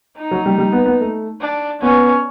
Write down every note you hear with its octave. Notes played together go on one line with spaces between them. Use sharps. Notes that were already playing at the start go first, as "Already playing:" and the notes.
D#4
F#3
G3
G3
B3
B3
A3
D4
B3 C#4